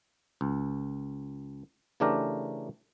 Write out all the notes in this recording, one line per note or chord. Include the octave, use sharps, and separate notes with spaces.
C#2
C#3 E3 A3 D4 G4 A#4